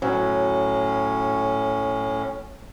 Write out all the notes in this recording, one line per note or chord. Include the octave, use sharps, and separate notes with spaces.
A2 F#3 C#4